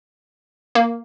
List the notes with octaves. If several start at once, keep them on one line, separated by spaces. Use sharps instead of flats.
A#3